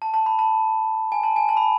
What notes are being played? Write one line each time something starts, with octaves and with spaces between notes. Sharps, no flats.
A5
A5
B5
A5
G#5
A5
G#5
A5
B5